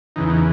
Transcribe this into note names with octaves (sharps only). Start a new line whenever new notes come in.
E2 C#3 E3 D#4
D#4